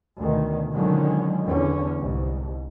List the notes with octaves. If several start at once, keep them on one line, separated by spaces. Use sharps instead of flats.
D2 B2 D#3
D3 D#3 F3 F#3 G#3 C#4
E2 D3 C#4
C2 G#2